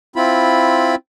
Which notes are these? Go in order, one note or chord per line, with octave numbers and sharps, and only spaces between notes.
C4 E4 F4 B5